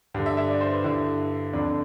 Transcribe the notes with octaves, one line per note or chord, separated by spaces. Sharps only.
G2 D3
E5
E5
D5
C5
B4
G2 D3 E4
F2 D3 D4